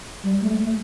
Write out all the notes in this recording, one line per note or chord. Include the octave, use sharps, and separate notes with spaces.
G3
A3
A3